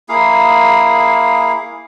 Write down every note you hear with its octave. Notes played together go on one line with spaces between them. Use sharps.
A#3 E4 G#4 F5